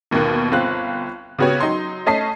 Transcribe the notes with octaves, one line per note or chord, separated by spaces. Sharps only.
G1 D#2 B2 D#3 A#3 F#6
G1 C4 F4 F#6
C#3 B3 F#4 G4 C#5
F#3 D#4 C6
A3 C#4 D#5 A5 B6 C7